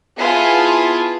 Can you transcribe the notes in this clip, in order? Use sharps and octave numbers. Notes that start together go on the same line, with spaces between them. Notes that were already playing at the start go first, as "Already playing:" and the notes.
B3 E4 F4 G#4 G#5 A5